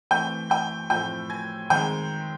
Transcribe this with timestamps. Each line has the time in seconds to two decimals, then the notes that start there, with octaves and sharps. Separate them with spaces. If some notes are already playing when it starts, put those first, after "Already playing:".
0.11 E3 A3 C4 G5 G6
0.50 G5 G6
0.90 A2 F3 A3 C4 G5 G6
1.30 G#5 G#6
1.70 D#3 G#3 C4 G5 G6